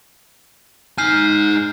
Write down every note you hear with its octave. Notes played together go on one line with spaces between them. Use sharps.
D#4 G#5 F6 G6 C7